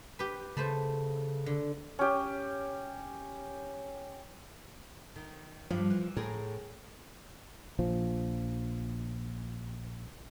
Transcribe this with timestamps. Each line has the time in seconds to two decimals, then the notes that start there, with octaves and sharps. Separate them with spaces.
0.19 G4 B4
0.57 C#3 A3 B4 C5
1.46 D3
1.99 C#4 G4
5.16 D#3
5.71 G2 F3
5.90 E3
6.17 A2 G#4 A#4
7.79 A#1 F3